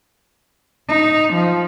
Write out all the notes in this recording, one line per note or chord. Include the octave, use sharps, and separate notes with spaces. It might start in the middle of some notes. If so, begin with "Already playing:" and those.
D#4
F3